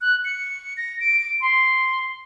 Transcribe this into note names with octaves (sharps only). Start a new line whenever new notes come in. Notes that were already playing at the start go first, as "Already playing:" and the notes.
F#6
C#7
A#6
D7
C6